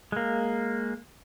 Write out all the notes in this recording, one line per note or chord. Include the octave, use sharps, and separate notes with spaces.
G#3 A#3